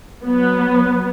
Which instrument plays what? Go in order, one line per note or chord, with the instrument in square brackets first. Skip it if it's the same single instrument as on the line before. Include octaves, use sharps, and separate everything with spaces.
[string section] F#3 B3